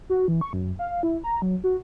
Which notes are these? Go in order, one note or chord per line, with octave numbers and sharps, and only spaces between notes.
F#4
E3
C#6
F#2
F5
E4
A#5
F#3
F#4